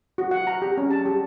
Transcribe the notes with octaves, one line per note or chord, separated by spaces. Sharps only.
F#4
F#5
A#5
G4
C#4
A5
G4